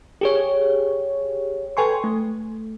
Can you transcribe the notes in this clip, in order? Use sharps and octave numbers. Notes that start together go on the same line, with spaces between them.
G4 G#4 C#5
A4 B4 G5 G#5 C6 C#6
A3